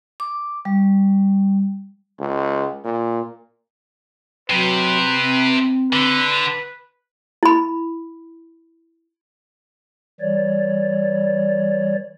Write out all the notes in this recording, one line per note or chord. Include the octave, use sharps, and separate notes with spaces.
D6
G3
C#2
A#2
C3 F#3 B4
C4
D3 B4
E4 B5
E3 G3 C#5 D5